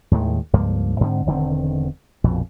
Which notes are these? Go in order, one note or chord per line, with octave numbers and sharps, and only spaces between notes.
D#2 A2 D#3 G#3
C#2 G2 F3 A#3
G#2 D3 C4
E1 D3 D#3 C4
A#1 F2 B2